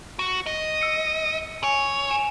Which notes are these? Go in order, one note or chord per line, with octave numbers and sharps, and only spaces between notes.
F#4
D#5
E6 C#7
C#5 G#5
G#5 E7